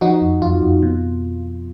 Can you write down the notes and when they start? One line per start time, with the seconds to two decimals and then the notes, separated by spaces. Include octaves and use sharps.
0.01 F3 D#4 F#4
0.22 F2
0.42 F2 F4
0.62 F2
0.82 B2